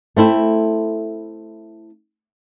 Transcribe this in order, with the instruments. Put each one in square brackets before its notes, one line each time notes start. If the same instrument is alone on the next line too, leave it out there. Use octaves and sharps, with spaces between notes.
[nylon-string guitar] A3 C4 E4